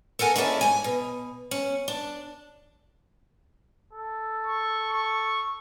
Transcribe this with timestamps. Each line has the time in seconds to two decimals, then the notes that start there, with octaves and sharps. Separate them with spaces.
0.19 A4 A#4 F#5 G#5
0.36 G#3 A#3 C#4 E4 A4 D5
0.61 G#2 G#5
0.84 B2
1.51 C#4
1.88 D4
3.93 A4
4.47 C#6
4.93 C#6